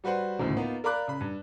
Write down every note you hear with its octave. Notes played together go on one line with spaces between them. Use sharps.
G3 F#4 B4 C5 F#5
G#1 D2 A2 C#3
A#3 B3 D#4 F4
A#4 D5 F5 B5 D6 F#6
C#3 B5
G2